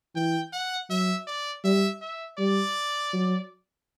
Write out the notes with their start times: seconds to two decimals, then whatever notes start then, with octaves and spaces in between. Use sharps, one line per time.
0.16 E3 G5
0.53 F#5
0.90 F#3 E5
1.27 D5
1.64 G3 E5
2.02 E5
2.39 G3 D5
3.13 F#3